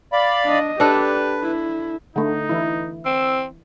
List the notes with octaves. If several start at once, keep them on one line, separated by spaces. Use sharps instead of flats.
D5 F5 B5
D4 D#5
D4 G4 A4 B4
E4
D3 A3 D#4
E3 E4
C4 E6